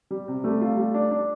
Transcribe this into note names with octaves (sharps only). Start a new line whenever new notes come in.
G3
C3
G3 A3
F4
G3
D4
D4